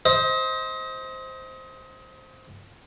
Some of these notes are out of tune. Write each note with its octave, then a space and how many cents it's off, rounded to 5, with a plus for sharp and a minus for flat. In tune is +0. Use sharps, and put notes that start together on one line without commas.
C5 +0 D#5 +30